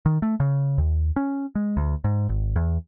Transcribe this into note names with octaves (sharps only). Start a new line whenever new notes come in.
D#3
A3
C#3
D#2
C#4
G#3
D2
G#2
G#1
E2